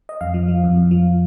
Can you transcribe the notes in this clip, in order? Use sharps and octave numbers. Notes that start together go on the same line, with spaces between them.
D#5
F2 F5
F3
F3
F2
F2
F3